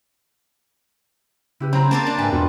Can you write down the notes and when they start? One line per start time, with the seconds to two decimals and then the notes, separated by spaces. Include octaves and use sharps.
1.60 C#3 E4 G4 B4
1.73 F#3 C4 C5 A#5 B5
1.91 A#3 C4 G4 A5
2.07 D4
2.18 G#2 B4 E5 G#5
2.32 E2 B2 F4 B5